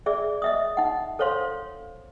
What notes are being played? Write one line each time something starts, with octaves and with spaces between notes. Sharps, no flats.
G#4 D5 E5
D#5 E5 D#6
D#4 F#5
A4 C5 C#5 F5 C6